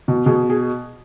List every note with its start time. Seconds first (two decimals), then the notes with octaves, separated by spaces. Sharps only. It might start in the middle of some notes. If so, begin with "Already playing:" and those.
0.08 B2
0.26 B2 G#4
0.50 G#4